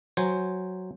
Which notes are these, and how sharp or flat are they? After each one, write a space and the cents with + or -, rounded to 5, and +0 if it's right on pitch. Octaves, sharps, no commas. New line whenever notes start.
F#3 +0 C5 +0 G#5 +0